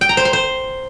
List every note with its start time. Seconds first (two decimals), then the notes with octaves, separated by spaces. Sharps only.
0.01 G5
0.09 A#5
0.17 C5
0.25 C6
0.33 C5